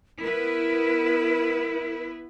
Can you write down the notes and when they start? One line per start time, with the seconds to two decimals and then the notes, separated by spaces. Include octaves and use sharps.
0.21 B3 E4 A#4 B4